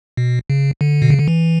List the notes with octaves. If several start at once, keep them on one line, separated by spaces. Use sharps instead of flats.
B2
C#3
D3
B2
C#3
D3
E3